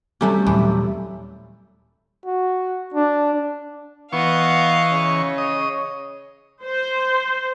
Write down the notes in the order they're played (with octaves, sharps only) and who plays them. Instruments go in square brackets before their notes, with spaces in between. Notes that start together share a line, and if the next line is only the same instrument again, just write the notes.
[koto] C3 F#3 C#4 [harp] G3 G4 [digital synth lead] A3
[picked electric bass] D#2 A#2 F#3 [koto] E3
[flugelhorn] F#4
D4
[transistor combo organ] E3 C#6 [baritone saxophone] B3 [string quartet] D#5 F5
[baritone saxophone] C#3 [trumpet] C#5
[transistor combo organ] D#5
[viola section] C5